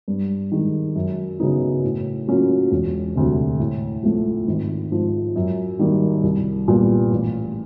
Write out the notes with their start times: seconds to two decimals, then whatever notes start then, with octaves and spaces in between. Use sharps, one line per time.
0.08 G2
0.52 D#3 G#3
0.95 F#2
1.40 C#3 F#3 B3 D#4
1.84 A2
2.27 F#3 A#3 C#4 F4
2.71 E1
3.15 D2 C3
3.60 A2
4.03 F3 A3
4.47 G#1
4.92 G#2 F3
5.36 F#2
5.79 D#3 G3 A#3
6.23 C2
6.68 A#2 G3 B3
7.11 A1